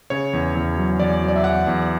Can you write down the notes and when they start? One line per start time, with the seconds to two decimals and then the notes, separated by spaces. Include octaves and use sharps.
0.10 C#3 C#5
0.33 E2
0.55 E2
0.78 F#3
0.99 E2 D5
1.22 F#3
1.28 D5
1.36 E5
1.44 E2 F#5
1.67 E2